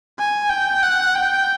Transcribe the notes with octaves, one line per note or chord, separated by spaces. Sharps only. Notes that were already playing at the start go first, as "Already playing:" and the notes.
G#5
G5
F#5
G5